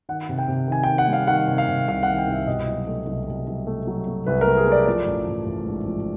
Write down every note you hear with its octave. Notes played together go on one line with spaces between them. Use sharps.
D#3 F#5
C3
G5
C3
D#3 G#5
G5
D#3
F#5
G3 F5
D#3 F#5
C3
F5
C3
C2 F5
F#5
D#3
G5
C2 E5
B2 D#5
F#3
A3
C2
C2
C2
A3
F#3
A3
C2 B4
A#4
A3
G#4
A3
D5
F3 D5
A1
A1
A1
G#2
F3